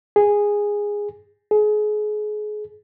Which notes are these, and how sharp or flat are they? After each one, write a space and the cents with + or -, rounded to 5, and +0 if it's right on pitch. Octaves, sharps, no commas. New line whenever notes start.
G#4 -10
G#4 +30